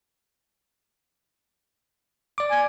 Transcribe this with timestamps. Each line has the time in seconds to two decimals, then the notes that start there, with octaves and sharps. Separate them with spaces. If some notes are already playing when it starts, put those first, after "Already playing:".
2.38 D5 D6
2.51 G#5